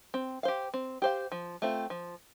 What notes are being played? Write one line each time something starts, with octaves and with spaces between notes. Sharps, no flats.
C4
G4 C5 F5
C4
G4 C5 F5
F3
A3 C4 F4
F3